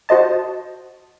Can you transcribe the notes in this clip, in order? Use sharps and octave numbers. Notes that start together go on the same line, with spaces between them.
F#4 C5 D#5 A5